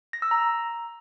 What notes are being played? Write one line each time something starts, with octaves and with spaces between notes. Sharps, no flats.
A#6
E6
A#5